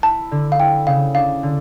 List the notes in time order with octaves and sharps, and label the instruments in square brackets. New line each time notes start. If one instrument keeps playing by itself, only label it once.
[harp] E4 [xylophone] A5
[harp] D3
[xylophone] F5
[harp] E4 [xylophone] G5
[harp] C#3 [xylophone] F5
[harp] D4 [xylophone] F5
[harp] D3